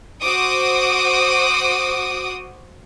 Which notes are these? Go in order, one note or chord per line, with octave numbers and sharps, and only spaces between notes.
F#4 C5 D6 D#6